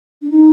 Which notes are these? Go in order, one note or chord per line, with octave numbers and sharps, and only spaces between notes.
D4
D#4